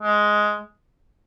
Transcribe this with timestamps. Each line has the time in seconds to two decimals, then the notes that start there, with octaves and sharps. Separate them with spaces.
0.03 G#3